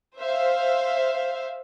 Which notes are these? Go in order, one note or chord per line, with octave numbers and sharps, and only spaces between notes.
C5 E5 F5